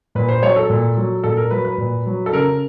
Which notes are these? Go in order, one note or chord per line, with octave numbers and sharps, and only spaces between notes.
A#2 B4
C5
F#3 C#5
A4
A#2
F#3
A#2 A4
A#4
F#3 B4
B4
A#2
F#3
A4
C#3 A#4